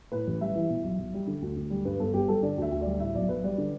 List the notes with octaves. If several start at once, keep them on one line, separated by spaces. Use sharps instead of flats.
A2 B4
A1
G3 E5
E3
B2
B1
B1
G3
D3
D2
D2
G3
G2 B4
G1 A4
G1 G4
G3 A4
D3 D5
D2 E5
D2
G3 D5
A2 E5
B1 D5
B1 B4
G3 D5
D3